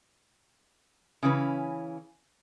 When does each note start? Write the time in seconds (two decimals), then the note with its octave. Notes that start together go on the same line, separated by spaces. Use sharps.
1.23 C#3 E3 C#4 B4